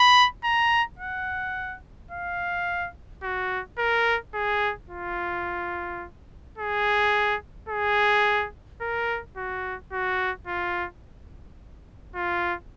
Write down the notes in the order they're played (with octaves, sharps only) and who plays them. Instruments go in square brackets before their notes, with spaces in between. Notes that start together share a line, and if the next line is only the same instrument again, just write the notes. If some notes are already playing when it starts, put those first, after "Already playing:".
Already playing: [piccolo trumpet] B5
A#5
F#5
F5
F#4
A#4
G#4
F4
G#4
G#4
A#4
F#4
F#4
F4
F4